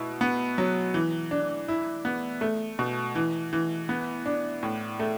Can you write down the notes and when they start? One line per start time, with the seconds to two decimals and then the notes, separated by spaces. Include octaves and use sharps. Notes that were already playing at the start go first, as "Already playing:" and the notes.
Already playing: B2 E4
0.21 B3
0.58 F#3
0.94 E3
1.31 D4
1.68 E4
2.05 B3
2.41 A3
2.79 B2
3.15 E3
3.53 E3
3.89 B3
4.26 D4
4.63 A2
5.00 A3